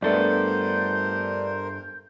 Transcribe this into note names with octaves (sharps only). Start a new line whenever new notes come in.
G2 A3 B3 D4 A4 A#4 C5 G6